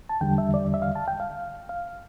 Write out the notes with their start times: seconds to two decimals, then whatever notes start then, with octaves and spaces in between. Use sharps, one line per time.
0.09 A5
0.21 E2 D3 G3 G5
0.38 E5
0.54 D5
0.74 E5
0.82 F5
0.95 A5
1.08 G5
1.20 F5
1.69 F5